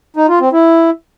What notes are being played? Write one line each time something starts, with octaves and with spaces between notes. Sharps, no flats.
D#4
F4
C4
E4